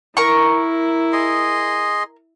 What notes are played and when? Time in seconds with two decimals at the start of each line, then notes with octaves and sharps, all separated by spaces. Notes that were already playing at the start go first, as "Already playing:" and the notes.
0.17 E4 A#4 C#6
1.13 G#4 D#5 C6